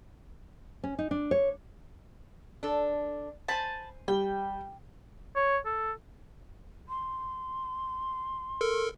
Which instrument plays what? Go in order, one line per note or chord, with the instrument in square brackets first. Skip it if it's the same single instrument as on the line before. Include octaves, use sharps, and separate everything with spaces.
[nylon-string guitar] C#4
D#4
D4
C#5
[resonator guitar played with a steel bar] D4 A4
[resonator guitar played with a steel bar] C5 G#5 [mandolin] A5 B5
[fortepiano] G3 [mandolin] G5
[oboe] C#5
A4
[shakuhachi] C6
[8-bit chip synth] A4 A#4